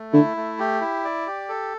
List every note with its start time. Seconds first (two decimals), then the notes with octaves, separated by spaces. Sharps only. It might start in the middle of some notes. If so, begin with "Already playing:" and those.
Already playing: A3
0.13 D3 E4
0.37 A3
0.59 G4
0.81 E4
1.05 D5
1.27 G4
1.49 A4